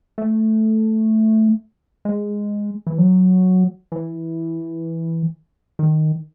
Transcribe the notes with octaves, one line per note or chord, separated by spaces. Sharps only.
A3
G#3
E3
F#3
E3
D#3